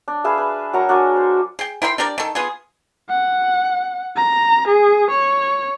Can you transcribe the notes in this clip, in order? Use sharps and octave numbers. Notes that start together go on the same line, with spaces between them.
D4
G#4 B4 E5 F5
B4
F#3 A#4 F#5 A#5
D4 F#4 A#4 G#5
C5
G#4 G5
E4 A#4 G5 C6
D4 G4 A#4 D5
D#3 A4
B3 F4 G#4
F#5
A#5
G#4
C#5